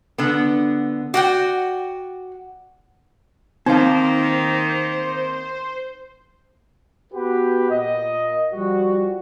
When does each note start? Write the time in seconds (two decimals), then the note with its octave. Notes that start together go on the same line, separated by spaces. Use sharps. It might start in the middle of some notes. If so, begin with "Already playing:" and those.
0.18 D3 B3
1.14 F#4 D5 F#5 G5
3.66 D#3 A#3 C4 D#4 C5 F5
7.13 B3 F#4 G4 B4
7.69 A#2 D#5
8.54 F3 G3 F#4